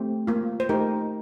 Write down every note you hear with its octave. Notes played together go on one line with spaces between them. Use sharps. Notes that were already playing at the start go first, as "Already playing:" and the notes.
Already playing: A3 C4 G4 C5
A#3 F4
C5
A3 D#4 G4 A#4